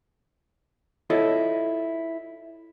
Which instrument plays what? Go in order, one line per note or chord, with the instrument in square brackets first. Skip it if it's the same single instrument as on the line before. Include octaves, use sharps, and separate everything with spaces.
[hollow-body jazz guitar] E4 F4 A4 C#5 D#5